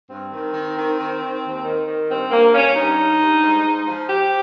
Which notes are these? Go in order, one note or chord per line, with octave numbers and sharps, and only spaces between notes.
G2 C4
D#3
D#3
D#3
D#3
D#3
D#2
D#3
D#3
G2 C4
G2 A#3
G2 C#4
G2 D#4
G2
G2
G#2
G#2
F3
F3 G4